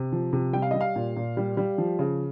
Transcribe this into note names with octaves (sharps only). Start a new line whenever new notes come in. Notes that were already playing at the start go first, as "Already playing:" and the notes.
Already playing: C3
F3
C3
G3 G5
F5
G3 D#5
F5
A#2
A#2
G3
G3
F3
C#3